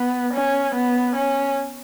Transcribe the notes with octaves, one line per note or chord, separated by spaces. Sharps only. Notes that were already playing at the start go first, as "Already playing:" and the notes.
Already playing: B3
C#4
B3
C#4